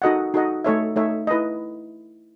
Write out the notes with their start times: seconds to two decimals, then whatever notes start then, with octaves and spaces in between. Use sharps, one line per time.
0.02 D#4 F#4 A4 D#5 F#5
0.34 D#4 F#4 A4 D#5 F#5
0.64 A3 D#4 A4 C#5 E5
0.96 A3 D#4 A4 C#5 E5
1.27 E4 B4 D#5